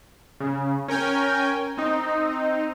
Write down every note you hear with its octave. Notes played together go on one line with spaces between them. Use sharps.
C#3
C#4 A#4 G5 G#5
C4 D#4